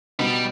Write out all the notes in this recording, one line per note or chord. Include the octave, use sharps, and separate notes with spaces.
B2 G3 B3 D#4